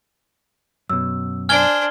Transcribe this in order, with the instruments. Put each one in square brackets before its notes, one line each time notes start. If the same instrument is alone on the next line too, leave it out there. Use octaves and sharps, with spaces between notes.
[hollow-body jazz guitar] F#2 B2 [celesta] E6
[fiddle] D4 C5 [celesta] G#5 D7 [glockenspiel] F6 G#6 G7